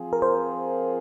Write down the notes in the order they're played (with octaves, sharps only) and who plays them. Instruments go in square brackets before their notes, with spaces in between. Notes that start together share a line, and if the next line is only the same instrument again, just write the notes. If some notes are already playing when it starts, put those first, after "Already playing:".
Already playing: [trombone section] F3 C4 F4 G#4
[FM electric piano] A#4
C5